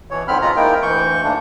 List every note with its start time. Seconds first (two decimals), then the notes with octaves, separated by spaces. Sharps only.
0.11 B2 E3 C#5
0.28 F2 G#2 D3 C4 B5 F6
0.42 B2 G#3 F4 A#5
0.57 G#3 A#3 D#4 E4 A#4 G5
0.82 D2 E3 C#6 G6
1.24 D2 G#2 A3 A#3 D4